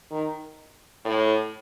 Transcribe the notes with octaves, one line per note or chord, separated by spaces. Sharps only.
D#3
A2